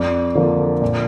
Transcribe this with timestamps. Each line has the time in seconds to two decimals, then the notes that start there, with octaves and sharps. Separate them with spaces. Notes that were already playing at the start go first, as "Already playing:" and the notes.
Already playing: F2 D5
0.35 D3 F3 A#3
0.82 A#2